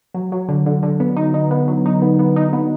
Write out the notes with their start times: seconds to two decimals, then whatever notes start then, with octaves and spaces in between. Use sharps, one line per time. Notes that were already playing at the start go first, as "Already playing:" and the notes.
0.14 F#3
0.32 F#3
0.49 D3
0.66 D3
0.83 D3
1.00 B3
1.17 D#4
1.34 D#4
1.51 B3
1.68 F#3
1.86 D#4
2.02 B3
2.19 B3
2.36 D#4
2.53 B3